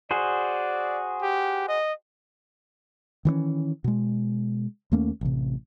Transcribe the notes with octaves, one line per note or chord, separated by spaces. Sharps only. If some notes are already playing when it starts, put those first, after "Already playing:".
F#4 G#4 C5 D5
G4
D#5
D#3 E3 A3 C#4
B2 G#3
D#2 A3 A#3 C#4
A1 C3